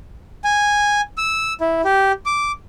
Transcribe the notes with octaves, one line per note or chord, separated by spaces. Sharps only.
G#5
E6
E4
G4
D6